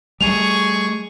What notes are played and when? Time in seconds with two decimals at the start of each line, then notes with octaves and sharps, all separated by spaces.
0.21 G3 A3 G#4 C#6 F7